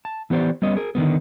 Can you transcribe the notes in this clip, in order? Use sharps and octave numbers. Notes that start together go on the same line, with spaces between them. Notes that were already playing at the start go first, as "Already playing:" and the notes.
A5
E3 B3 G4 C5 D5
G3 B3 C#4 D#5
G#4 A#4
D3 D#3 G3 B3